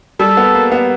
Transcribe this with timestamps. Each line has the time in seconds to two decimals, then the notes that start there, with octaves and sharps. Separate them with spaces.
0.19 G3 A4
0.37 B3
0.54 A#3
0.72 B3